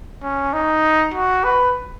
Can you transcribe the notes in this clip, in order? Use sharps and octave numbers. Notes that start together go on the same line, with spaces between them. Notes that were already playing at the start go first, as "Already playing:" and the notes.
C#4
D#4
F#4
B4